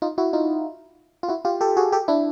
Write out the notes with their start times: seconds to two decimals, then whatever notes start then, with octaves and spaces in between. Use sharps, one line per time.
0.02 D#4 F4
0.18 E4 F#4
0.33 D#4 F4
1.23 F4
1.28 E4 F#4
1.45 F4 G4
1.61 G4 A4
1.77 F#4 G#4
1.92 G4 A4
2.08 D4 E4